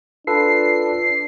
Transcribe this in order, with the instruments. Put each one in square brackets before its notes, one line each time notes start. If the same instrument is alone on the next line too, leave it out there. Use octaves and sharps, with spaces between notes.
[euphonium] D4 [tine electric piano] F4 A4 B4 [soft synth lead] C7